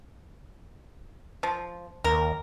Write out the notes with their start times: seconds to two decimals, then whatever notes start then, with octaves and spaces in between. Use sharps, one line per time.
1.43 F3
2.04 D#2 A#4